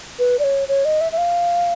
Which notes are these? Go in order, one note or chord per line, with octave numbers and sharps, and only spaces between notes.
B4
D5
C#5
C#5
D#5
E5
E5
F5